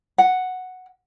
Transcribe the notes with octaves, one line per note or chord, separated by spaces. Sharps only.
F#5